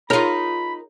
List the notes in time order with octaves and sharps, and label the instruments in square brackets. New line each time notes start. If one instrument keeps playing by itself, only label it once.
[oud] D#4 F4 [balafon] G#4 C#5 [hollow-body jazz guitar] A#4 [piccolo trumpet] B5